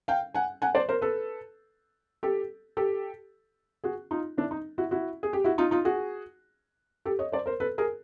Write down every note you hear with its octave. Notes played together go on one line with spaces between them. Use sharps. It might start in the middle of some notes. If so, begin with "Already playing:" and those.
F5 G5
F#5 G#5
F#5 G#5
C5 D5
A#4 C5
A4 B4
G4 A4
G4 A4
F#4 G#4
D#4 F4
D4 E4
D#4
E4 F#4
E4 F#4
G#4
G4
E4 F#4
D#4 F4
D#4 F4
F#4 G#4
G4 A4
C#5 D#5
C5 D5
A#4 C5
A4 B4
G#4 A#4